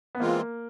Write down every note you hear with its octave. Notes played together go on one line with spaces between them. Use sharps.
B3
E3 G#3 A#3 C4 F4